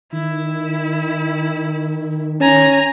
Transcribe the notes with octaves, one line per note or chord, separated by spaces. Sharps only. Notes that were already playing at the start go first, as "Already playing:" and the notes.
D#3 E4
C#4 G#5 A#5